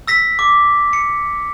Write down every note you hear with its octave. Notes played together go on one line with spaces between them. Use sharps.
E6 A#6 B6
D6
C#7